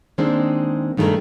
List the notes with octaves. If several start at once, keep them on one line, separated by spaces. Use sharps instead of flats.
D#3 G#3 A#3 C4 D4
G2 D#3 A3 D#4 G#4 A#4